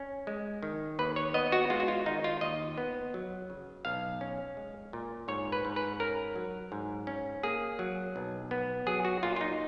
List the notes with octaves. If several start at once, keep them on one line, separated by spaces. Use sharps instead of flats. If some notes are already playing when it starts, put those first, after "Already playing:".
Already playing: C#4
G#3
D#3
D#2 B4
C#5
B3 D#5
F#4
G#3 F4
F#4
F4
D#3 D#4
F4
D#2 D#5
B3
F#3
C#3
B1 F5
C#4
G#3
A#2
G#2 C#5
B4
G#2
B4
C#4 A#4
F#3
G#2
C#4
A#3 G#4
F#3
B1
B3
F#3 G#4
F#4
A#2 F4
F4
D#4